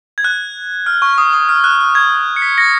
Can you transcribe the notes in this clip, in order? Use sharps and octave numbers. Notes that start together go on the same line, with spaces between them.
G#6
F#6
F6
C#6
F6
D#6
D#6
F6
F#6
F#6
G#6
C#7
B6
A#6 C#7